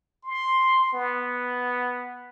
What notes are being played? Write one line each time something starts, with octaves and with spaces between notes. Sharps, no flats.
C6
B3